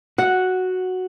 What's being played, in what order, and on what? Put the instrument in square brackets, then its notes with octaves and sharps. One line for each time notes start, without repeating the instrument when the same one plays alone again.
[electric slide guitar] F#4 [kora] F#5